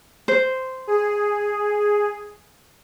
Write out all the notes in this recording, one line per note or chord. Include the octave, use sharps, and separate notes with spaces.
C5
G#4